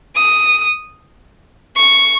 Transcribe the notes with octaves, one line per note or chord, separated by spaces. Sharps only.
D#6
C#6